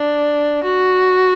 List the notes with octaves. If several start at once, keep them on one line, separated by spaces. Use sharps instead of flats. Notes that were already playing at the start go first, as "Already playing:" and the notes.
Already playing: D4
F#4